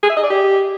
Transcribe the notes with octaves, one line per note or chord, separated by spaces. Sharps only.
G#4
E5
D#5
D5
G4